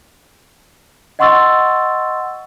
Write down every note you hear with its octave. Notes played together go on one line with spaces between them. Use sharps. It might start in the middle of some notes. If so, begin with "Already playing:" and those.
D#5 F#5 C6 C#6 E6 A6